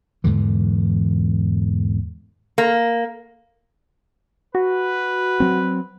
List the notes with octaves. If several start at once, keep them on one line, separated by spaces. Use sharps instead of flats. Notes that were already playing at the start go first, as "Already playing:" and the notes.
E2 G#2 D3 E3
A#3
F#4 B4
F#3 C4